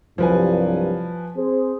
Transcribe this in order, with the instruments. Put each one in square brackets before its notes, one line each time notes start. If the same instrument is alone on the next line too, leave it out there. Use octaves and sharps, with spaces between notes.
[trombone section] C2 G2 F#3 [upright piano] F3 B4 G#5
[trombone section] C4 G#4 C5